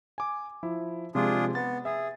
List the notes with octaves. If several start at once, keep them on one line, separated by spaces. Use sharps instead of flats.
G#5 D6
F3 E4
C3 F3 G#3 D4 F4 G#4
B3 A6
G#4 E5